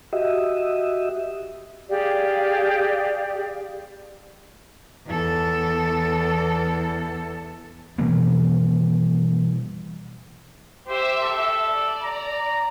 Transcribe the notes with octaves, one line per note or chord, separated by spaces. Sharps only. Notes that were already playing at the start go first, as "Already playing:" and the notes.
F#4 G4 D#5 E5
G4 G#4 D5 F5
E2 A4
B2 E3 G3 A#3
G4 C5 E5
A4
D5
A#5